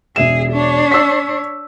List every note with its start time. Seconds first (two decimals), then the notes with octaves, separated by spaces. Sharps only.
0.16 E1 G#4 E5 E7
0.52 D4 C#5
0.91 E6 B6